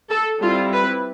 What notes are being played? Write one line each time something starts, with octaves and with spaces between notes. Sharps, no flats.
A4
G3 C4 E4 F4
B4